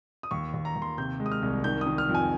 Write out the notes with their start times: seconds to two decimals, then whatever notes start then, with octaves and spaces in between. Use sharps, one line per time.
0.23 D#6
0.31 D#2 C#6
0.54 D#2
0.65 A#5
0.76 D#2
0.82 C6
0.98 C3 G6
1.20 G#3
1.26 D#6
1.32 F6
1.42 C2
1.64 D#3 G6
1.81 D#6
1.87 D#3
1.98 F6
2.09 F2
2.15 G#5